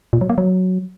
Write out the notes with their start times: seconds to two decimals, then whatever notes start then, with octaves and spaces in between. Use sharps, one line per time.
0.13 A#2
0.21 F#3
0.30 A#3
0.38 F#3